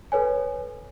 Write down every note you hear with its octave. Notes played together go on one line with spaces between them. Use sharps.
A4 B4 C#5 G#5